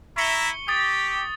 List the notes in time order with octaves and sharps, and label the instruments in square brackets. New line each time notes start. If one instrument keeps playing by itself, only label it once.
[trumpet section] E4 E5 A#5 [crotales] C#6 C#7 G7
[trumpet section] G4 [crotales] D#6 A6